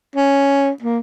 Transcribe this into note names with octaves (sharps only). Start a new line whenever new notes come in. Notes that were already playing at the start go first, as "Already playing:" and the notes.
C#4
A#3